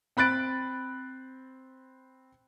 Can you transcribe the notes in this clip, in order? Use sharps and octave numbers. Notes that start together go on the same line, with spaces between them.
C4 B5 F#6 A6 D7